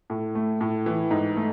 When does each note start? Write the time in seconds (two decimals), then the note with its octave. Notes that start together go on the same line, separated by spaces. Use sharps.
0.10 A2
0.35 A3
0.61 A2
0.86 E3
1.11 G#2
1.36 A3